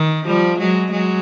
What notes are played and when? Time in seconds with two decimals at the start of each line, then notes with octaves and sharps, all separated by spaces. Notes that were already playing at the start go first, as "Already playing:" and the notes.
Already playing: D#3
0.26 F3 G3
0.58 F#3 G#3
0.91 F#3 G#3